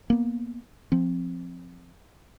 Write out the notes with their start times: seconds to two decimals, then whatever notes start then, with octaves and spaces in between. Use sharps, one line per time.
0.10 A#3 B3
0.92 F3 C4